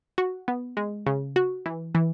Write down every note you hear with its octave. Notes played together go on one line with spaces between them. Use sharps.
F#4
B3
G#3
C#3
F#4
E3
E3